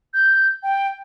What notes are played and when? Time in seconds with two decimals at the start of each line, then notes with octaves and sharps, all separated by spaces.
0.14 G6
0.63 G5